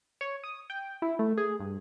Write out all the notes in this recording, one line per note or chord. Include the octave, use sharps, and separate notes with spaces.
C#5
D#6
G5
E4
A3
G#4
G2